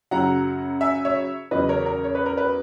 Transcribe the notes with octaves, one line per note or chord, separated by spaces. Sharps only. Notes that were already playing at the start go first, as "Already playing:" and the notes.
F#2 C#3 F#3 F#5 A#5
E5 G#5
C#5 E5
E2 C#3 F#3 B4 D#5
A#4 C#5
A#4
C#5
B4
A#4
B4